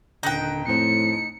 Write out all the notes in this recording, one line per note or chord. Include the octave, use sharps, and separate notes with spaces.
D#1 D3 D#4 G5 F#6 A#6
F2 A2 C4 C#7